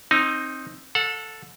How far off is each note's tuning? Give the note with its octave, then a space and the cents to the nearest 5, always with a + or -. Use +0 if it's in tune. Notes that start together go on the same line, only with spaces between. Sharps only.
C4 +20 D#4 +0 A#5 +0
A4 +5 F#5 -35